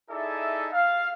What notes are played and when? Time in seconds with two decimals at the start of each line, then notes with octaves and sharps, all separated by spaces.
0.10 D#4 E4 G#4 A4 D5 E5
0.72 F5